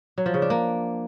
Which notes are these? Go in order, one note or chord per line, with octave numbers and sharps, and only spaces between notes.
F#3
F3
C#3
D4
A#3